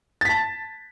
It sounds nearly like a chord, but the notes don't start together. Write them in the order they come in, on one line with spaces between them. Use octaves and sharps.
A6 B6 A5